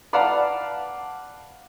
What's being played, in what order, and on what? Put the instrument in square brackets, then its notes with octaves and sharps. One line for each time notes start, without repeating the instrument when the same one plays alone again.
[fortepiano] B4 D5 F5 F#5 A5 A#5